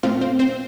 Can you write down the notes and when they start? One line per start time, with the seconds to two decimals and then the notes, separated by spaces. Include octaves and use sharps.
0.03 A#2 A3 C4 F4 F5
0.21 C4 C5
0.39 C4 C5